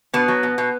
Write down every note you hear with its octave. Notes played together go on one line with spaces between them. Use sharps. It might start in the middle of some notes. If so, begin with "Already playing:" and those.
B2 B3
F#3
B2
B2